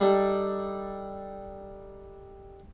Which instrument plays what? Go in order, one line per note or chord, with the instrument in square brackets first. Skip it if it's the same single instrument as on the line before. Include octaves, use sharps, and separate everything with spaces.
[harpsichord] G3 D4 D#4 G4 A4